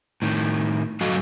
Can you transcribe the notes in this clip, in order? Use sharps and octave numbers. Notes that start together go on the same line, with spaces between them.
A2 D#3
G2 F#3 F#4 A4 D#5 F5